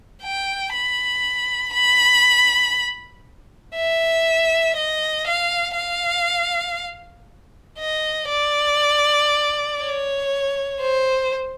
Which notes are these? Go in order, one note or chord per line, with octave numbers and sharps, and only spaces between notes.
G5
B5
B5
E5
D#5
F5
F5
D#5
D5
C#5
C5